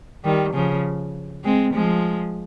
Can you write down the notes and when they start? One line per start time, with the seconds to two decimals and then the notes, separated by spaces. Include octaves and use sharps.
0.24 D#3 G3
0.54 C#3 F3
1.44 G#3 C4
1.74 F3 G#3